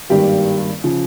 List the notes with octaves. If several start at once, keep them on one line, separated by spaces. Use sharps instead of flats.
G#1 G2 D#3 G3 A#3 G4
C#3 F3